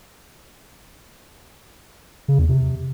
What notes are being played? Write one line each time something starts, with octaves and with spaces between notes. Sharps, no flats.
C#3
E2
C3